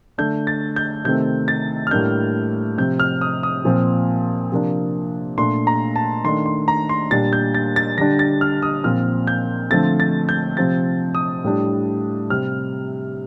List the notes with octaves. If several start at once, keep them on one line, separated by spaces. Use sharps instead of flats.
D3 A3 D4 G6
A6
G6
C3 D#3 A3 C4 G6
A6
F6
A2 G3 A#3 D4 G6
C3 F3 C4 G6
F6
D#6
D#6
A#2 F3 C4
C3 F3 A#3 D4
A#2 A3 D4 C6
A#5
A5
D#3 A3 D4 C6
C6
A#5
C6
A#2 G3 D4 A6
G6
A6
A6
D3 G3 D4 A#6
A6
F6
D#6
A#2 F3 C4 F6
G6
D3 F3 A3 C4 A6
A6
G6
C3 F3 C4 A6
D#6
A2 G3 D4
C3 G3 C4 F6